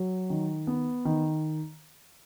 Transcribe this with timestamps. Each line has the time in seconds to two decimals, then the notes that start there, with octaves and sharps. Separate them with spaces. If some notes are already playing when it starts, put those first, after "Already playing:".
Already playing: F#3
0.30 D#3
0.67 B3
1.05 D#3